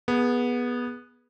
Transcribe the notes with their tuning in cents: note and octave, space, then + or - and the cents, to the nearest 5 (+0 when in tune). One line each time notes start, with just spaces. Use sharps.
B3 -15 G#4 +0